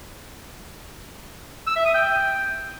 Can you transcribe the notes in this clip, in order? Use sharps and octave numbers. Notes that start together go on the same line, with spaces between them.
E6
E5
D#6
G5